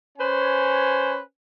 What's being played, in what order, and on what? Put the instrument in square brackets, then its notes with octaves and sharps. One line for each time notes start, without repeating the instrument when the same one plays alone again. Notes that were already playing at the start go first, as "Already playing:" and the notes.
[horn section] C#4 B4 C5 G#5